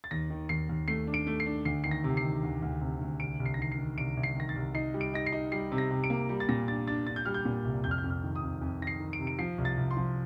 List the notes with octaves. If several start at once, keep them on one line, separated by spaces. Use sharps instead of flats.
A6
D#2 A#6
D#3
D#2 C7
D#2
A3 C7
D4
D7
A3
C7
D4
D2 C7
D#3 C7
A#6
C3
C7
D#3
D2
D2
C3
D2
C2 D7
C2
C7
A#6
D#3 C7
C7
D#3
C2 D7
C2
C7
D#3 A#6
A6
C2
D#4 C7
G3
D7
D#4 A#6
C7
D#4
G3 C7
C3
A#6
C3
D7
A#3
G3
A6
A#2 A#6
D4 A6
D4 A6
D4 A6
G6
G3 F6
G6
A#2
C2
F2 G6
F6
G6
F2
F6
D#3
D#6
F2
F2
D#3 A#6
C7
D#3
D7
C3
D7
F3 C7
C2
A6
C2
C6
F3